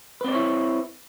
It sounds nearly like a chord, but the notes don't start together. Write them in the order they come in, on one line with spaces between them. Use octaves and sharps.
B4 C4 D5 C#5 E4